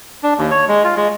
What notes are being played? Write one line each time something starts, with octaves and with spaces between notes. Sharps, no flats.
D4
D#2
C#5
G#3
F4
G#3